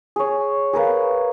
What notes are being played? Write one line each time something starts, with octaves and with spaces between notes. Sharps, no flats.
G#4 C#5
G#4 A#4 B4 F5